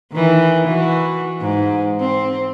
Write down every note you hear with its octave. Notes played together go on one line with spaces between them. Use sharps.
D#3 E3
E3 F#4
G#2
C4